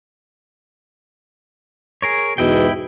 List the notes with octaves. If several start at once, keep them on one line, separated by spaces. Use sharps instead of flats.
G#4 A#4 C#5
E2 G#2 B2 E4 D#5 G5